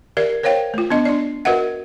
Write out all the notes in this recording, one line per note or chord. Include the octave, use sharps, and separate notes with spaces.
G4 A#4 D5 E5
A#4 C5 C#5 F5 G5
A3 F4
B3 D4 D#5
D4 D5
F#4 A#4 B4 D#5 E5 F#5